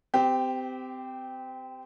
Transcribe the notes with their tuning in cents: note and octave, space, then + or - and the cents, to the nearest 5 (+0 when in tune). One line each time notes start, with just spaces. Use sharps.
C4 -30 G4 +0